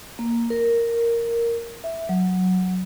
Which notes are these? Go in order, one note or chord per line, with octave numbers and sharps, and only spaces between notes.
A#3
A#4
E5
F#3